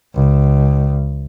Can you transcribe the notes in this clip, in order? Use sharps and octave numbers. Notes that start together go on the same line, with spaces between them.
C#2